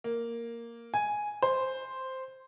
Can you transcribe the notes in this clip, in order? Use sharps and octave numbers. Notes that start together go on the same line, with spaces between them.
A#3
G#5
C5